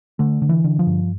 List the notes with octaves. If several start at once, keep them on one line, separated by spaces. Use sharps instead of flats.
D3 A3
D3
E3
D3
F3
G2